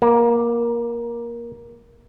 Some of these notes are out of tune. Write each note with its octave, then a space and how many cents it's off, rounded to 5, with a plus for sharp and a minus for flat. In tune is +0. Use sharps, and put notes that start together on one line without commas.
A#3 +15